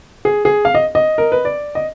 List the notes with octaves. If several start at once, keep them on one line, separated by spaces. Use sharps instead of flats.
G#4
G#4
F5
D#5
D#5
A#4
B4
D5
D#5